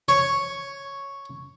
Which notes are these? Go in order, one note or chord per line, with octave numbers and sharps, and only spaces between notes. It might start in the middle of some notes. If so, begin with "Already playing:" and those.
C#5